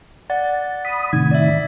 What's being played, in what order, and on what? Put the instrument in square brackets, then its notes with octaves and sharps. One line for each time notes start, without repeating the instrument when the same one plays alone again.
[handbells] D5 F#5 A6
[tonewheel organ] B5 D#6
[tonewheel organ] A2 C3 D#3 [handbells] G#6
[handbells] D5 E5